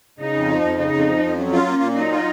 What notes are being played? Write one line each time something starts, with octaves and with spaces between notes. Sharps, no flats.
C#3 D#4
F2
F3
F2
C#3 D#4
F2
F3
F2
F#3 C#4
F4
A#3
A#2
F#3 D#4
F4